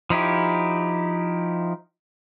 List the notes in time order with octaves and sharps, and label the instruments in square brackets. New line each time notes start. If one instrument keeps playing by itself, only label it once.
[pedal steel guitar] F3 D#4 E4 G4